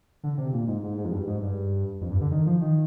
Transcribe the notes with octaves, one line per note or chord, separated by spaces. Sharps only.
D3
C3
A#2
G#2
G#2
G#2
F2
G2
G#2
G2
F2
G2
D3
D#3
F3
D#3